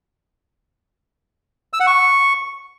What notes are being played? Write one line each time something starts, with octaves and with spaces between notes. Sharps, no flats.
E6
F#5
C#6